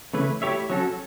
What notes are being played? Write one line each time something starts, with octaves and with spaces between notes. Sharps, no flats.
C#3 E3 A3 E4 B4
A3 E4 G4 C#5 E5
F#3 C#4 F#4 A4